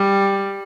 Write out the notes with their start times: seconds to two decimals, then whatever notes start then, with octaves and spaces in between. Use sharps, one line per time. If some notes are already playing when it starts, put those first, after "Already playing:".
Already playing: G3